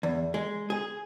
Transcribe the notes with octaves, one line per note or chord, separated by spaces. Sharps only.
E2
G#3
G#4